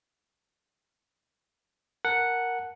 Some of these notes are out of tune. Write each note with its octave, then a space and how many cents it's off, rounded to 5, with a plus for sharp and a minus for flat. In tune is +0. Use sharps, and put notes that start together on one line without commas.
A#4 +0 F#5 +0 A5 +0